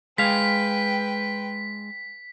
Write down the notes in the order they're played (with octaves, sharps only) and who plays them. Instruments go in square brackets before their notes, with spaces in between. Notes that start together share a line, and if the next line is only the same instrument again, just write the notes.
[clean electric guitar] G#3 F5 [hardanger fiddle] B4 G5 [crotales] B6